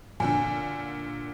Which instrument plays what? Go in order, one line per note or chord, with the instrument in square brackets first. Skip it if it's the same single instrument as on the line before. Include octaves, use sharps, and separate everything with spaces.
[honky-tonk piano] A#2 D3 [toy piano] C#5 G#5